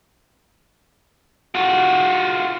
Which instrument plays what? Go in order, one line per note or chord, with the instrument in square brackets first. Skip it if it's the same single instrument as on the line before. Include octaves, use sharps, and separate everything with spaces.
[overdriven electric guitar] F4 F#4